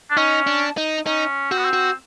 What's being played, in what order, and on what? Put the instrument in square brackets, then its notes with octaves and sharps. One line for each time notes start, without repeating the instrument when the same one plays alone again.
[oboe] D4
[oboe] C#4 [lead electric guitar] D#4
[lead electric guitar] D4
D#4
[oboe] C#4 [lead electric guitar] D#4
[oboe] C4 [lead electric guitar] F#4
[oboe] B3
C4
[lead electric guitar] F#4